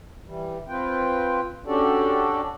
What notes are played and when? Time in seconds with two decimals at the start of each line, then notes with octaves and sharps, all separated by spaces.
0.26 E3 G3
0.68 C4 F4 B4 G5
1.66 C#4 D4 F#4 G4 A4 D5